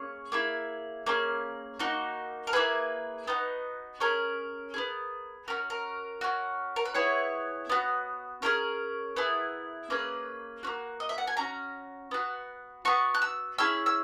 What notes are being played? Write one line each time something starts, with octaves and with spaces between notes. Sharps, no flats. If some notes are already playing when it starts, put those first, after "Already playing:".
Already playing: A#3 C#4 G#4 C#5
A#3 E4 G#4
A#3 C#4 G#4
A#3 D#4 F#4
A#4
A#3 E4 G#4 B4
B3 D#4 F#4
C#4 G#4 A#4
B3 E4 G#4
C#4 F#4 A#4
A#4
C#4 F#4
A#4
B4
B3 E4 G#4 C#5
B3 F#4
C#4 E4 G#4 A#4
B3 E4 G#4
A#3 C#4 G#4 B4
A#3 C#4 F#4
D#5
E5
F#5
G#5
C#4 F#4 A#5
B3 F#4
B3 F#4 C#6
F#6
E6
C#4 E4 G#4 E6
E6